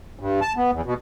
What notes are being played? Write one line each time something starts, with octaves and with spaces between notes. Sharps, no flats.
G2
A5
B3
E2
B2